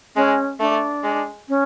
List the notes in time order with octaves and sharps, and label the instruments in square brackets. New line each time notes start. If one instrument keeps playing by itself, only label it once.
[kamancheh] G#3 [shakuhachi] C#4
[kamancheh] A3 [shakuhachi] D4
[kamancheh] G#3
[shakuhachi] C#4